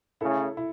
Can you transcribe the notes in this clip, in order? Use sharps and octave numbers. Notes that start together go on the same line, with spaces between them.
C#3 A3 C#4 E4 A4
E4